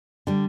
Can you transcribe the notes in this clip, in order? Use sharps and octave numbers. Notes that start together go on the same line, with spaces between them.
D3 G3